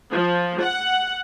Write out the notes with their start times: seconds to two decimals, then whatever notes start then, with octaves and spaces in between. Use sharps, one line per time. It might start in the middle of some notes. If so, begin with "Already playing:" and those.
0.10 F3
0.60 F#5